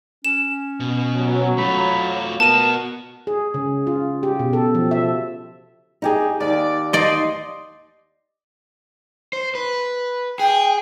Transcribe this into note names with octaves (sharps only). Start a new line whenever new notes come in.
C#4 E7
B2
F#3
A3 F4 B5
B3 F#4 A#4 A5 D#7
G#4
C#3
F4
G4
B2
A4
F3
E5
D#4 G4 G#4
D#2 D5
D#4 D5 D#5 C6
C5
B4
G#4 G5